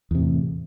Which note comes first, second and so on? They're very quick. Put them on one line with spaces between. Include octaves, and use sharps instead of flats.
E2 C3 A2